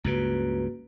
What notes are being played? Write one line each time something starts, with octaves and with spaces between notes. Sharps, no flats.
C#2 G2 C#3 A#3 F#4 B4